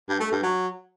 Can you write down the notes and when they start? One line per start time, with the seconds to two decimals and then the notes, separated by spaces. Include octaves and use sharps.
0.09 G2
0.20 A3
0.32 G2
0.43 F#3